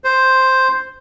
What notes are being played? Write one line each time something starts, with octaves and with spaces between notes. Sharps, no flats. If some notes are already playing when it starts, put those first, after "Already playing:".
C5